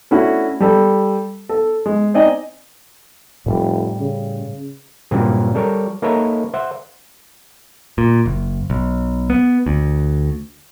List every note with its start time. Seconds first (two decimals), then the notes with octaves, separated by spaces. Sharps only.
0.11 A3 C#4 D4 E4 F#4
0.60 G3 A4
1.49 A4
1.86 G#3
2.14 C4 D#4 D5 D#5 G#5
3.46 F1 A2 G3
4.00 C#3
5.11 G2 A#2 C#3 F#3 C4
5.55 G3 A4 A#4 C#5
6.02 A#3 D#4 A4 B4 C#5 E5
6.54 C5 E5 F#5
7.98 A#2
8.26 F#1
8.70 B1
9.30 B3
9.66 D2